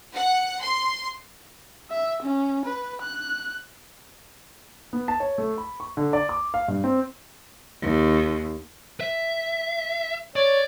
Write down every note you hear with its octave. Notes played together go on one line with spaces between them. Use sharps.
F#5
C6
E5
C#4
B4
F#6
B3
A5
C#5
A3
B5
C#6
D3
D5
D6
F5
G2
C4
D#2
E5
C#5 D5